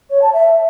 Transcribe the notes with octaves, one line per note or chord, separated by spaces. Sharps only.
C#5
A5
E5